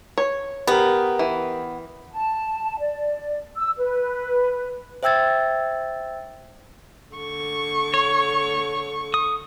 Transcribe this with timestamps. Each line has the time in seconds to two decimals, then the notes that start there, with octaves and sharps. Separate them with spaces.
0.18 C#5
0.67 B3 G4 A#4
1.19 E3
2.12 A5
2.80 D5
3.57 E6
3.78 B4
5.03 C5 E5 G5 E6 G#6 A6
7.15 D3 C#6
7.94 C#5
9.14 D#6